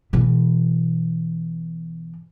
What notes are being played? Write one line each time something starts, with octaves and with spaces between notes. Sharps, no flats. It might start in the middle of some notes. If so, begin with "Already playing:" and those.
B2 E3